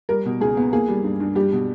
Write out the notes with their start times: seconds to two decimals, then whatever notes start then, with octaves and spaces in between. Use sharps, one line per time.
0.09 G3 A#4
0.26 B2
0.40 C#2 G#4
0.57 B3
0.73 A#3 G#4
0.88 G3
1.04 G2
1.20 G2
1.35 G3 G4
1.52 B2